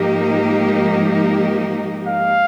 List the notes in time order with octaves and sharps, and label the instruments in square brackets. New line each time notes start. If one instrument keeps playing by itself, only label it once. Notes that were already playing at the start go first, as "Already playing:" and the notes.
Already playing: [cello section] G#2 F3 A#3 D#4 G4
[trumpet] F5